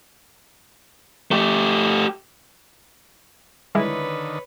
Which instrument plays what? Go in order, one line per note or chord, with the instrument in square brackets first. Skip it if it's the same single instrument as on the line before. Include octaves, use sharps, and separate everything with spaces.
[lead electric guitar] A3 G4
[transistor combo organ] D3 D#3 [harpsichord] G#3 [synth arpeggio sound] E4 [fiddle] B4 C#5